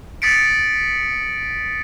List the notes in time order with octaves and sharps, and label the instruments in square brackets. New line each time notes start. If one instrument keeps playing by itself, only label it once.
[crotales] D#6 A6 B6 C#7 D7